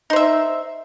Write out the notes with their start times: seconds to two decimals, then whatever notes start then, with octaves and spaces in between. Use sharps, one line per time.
0.10 D#4
0.13 C5
0.16 E5